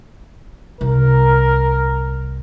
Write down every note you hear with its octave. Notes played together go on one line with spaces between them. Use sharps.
C2 A#4